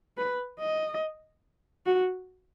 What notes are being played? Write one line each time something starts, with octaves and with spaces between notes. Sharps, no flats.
B4
D#5
F#4